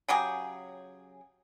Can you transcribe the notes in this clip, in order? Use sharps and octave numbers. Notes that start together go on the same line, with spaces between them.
C#3 F#3 G4 G#4